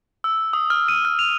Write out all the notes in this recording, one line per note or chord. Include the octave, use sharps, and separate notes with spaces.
E6
D#6
F6
D#7
F6
F7